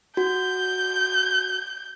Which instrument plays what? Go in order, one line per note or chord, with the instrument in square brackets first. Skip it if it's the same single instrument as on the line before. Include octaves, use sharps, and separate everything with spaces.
[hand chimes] F#4 [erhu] G6